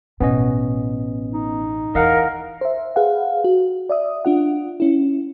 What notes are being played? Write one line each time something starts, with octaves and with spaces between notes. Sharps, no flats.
A1 B2 B3 C#4 D#5
D#4
E2 E3 A#4 D#5 F5 F#5
C5 E5
G#4 B4 F5 F#5
F#4
D5 E5 D#6
D4 F4 F#5
C#4 E4